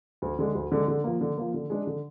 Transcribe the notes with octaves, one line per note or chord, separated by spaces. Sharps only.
D2
D3 G#3
D2
D3 G#3
D3
F3 A#3
D3
F3 A#3
D3
G#3 D4
D3